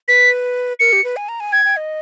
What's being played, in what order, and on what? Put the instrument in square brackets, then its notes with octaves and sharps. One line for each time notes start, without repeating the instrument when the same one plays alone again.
[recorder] B4 [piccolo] B6
[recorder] A#4 [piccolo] C#7
[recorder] G4
B4
G#5
A#5
G#5
[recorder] G5 [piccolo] G#6
[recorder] G5
D#5